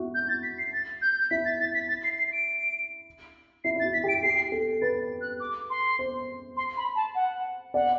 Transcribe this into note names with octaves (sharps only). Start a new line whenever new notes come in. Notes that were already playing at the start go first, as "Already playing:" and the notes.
Already playing: E4 F#4
G6
A6
B6
C7
A6
G6
E4 B6
A6
A6
B6
A6
C7
C7
D7
E4 C7
E4
A6
F#4
B6
G4
D7
G4 C7
A4
B4 A6
F#6
D6
C6
C5
C6
B5
A5
F#5
D5 F#5